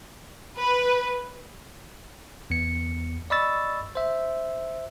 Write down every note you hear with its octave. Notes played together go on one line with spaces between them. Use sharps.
B4
E2 B3 C#7
D5 D#5 B5 C#6 E6 A6
C5 E5